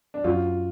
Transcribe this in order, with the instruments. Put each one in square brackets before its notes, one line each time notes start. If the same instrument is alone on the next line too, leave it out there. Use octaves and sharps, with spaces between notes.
[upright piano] D4
[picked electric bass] F#2 [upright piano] F4